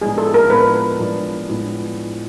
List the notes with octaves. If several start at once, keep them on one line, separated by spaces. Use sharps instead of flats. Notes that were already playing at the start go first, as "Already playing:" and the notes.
A2 F3 G#3 B3 D4 G#4
A4
A#4
A2 F3 G#3 B3 D4 B4
A2 F3 G#3 B3 D4
A2 F3 G#3 B3 D4